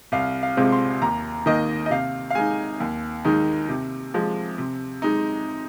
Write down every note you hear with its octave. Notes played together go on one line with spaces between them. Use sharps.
C2 F5
F5
C3 G#3 C4 F4
C6
D#2 A#5
D#3 A#3 D#5
D#5
C3 F5
F5
G#3 D#4 G#5
D#2
D#3 G#3 D#4
C3
F3 G#3
C3
G#3 D#4